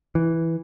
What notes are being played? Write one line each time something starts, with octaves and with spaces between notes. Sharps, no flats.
E3